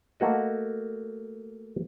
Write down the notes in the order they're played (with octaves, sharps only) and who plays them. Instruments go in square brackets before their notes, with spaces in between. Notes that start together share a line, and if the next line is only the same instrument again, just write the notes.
[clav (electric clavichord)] A3 A#3 F#4 D#5